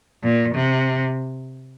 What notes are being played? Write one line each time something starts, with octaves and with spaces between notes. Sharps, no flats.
A#2
C3